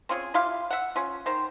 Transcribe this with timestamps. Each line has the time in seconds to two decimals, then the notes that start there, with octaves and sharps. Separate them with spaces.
0.09 C4 C#4 F4 G#4
0.34 E4 F4 G4 F5
0.70 E5 F#5
0.96 C#4 F4
1.26 D#3 C5